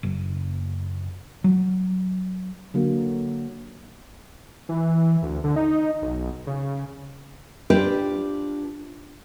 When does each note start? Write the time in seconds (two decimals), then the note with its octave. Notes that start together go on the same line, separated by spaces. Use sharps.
0.03 F#1
1.44 F#3
2.74 D3 F#3 A#3
4.69 E3
5.23 D2
5.44 D3
5.56 D#4
6.02 B1
6.47 C#3
7.70 D4 F4 G4 B4 C5 D5